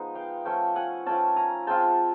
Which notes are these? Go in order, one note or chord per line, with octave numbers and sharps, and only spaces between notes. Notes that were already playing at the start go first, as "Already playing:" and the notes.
Already playing: F3 G#3 B3 D#4
F5 G5
F3 A3 C#4 G5 A5
F#5 G#5
F3 A3 C#4 G5 A5
G#5 A#5
G#3 C4 F4 G5 A5